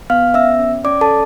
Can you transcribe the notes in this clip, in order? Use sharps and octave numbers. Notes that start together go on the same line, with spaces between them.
B3 F5 F6
C#4 E5 E6
C#4
C#4 D5 D6
A4 A5
C#4